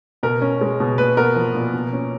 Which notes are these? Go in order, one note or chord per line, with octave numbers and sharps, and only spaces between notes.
B2 A#4
C#4
G#3
B2
A#2 B4
B3 A#4
F3
A#2
B2
C#4